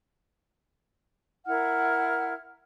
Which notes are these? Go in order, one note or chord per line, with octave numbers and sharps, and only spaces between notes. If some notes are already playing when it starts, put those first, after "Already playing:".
E4 A#4 F#5 F6